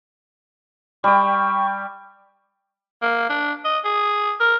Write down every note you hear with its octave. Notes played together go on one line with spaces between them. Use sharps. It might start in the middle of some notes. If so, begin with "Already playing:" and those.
G3 G5 C#6
A#3
D4
D#5
G#4
A#4